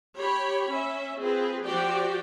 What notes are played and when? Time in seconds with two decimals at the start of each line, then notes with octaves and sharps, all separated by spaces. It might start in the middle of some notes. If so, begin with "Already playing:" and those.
0.18 G4 C#5 B5
0.69 C#4 E5
1.21 C4 F4 G#4 B4
1.64 F3 F#4 G4 C5 D5 G5